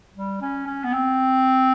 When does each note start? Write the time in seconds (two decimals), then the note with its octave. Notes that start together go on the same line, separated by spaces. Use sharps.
0.15 G3
0.41 C#4
0.67 C#4
0.84 B3
0.94 C4